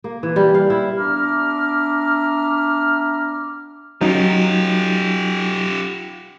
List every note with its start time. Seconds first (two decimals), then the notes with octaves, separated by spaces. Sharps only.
0.04 A#3
0.23 E3
0.36 G3
0.55 F5
0.70 E4
0.98 B3 D4 E5 A#5 D6 F6
4.01 F#3 C#4 D#4 F4 G4